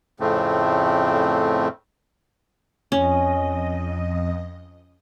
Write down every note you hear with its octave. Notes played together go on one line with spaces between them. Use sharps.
F2 A2 C#3 A3 C4
F2 C#4 D#5